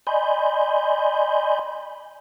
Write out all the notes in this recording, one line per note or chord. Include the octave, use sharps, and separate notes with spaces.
D5 D#5 G#5 B5 C6 G6